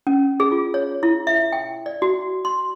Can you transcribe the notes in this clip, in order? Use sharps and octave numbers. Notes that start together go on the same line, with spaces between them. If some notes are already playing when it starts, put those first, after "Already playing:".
C#4
G#4
F4
C#5
E4
E5
G5
D5
F#4
C6